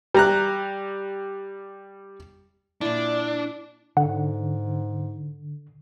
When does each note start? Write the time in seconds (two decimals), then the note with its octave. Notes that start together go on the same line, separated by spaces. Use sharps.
0.15 G3 A#5 F#6
2.81 A#2 D4 E4 D5
3.97 G#2 D3 F#5